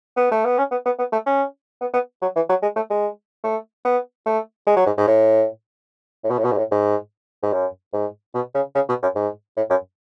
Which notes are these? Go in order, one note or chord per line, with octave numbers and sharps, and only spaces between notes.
B3
A3
B3
C#4
B3
B3
B3
A3
C#4
B3
B3
F#3
E3
F#3
G#3
A3
G#3
A3
B3
A3
G#3
F#3
G#2
G#2
A2
A2
B2
A2
B2
G#2
A2
G#2
G#2
F#2
G#2
B2
C#3
C#3
B2
F#2
G#2
A2
F#2